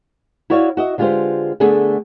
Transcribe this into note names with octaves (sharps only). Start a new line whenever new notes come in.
E4 F#4 C#5 D5 E5 F5
F#4 D#5 E5
D3 G#3 F4 G4 B4 C5
D3 A3 B3 G#4